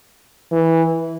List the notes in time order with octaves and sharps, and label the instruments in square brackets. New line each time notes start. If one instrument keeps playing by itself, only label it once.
[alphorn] E3